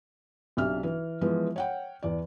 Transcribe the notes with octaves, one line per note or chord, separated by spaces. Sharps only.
B1 C3 D4 E5 F6
E3
E3 F3 G#3 B3
C#5 F#5 G5
E2 D5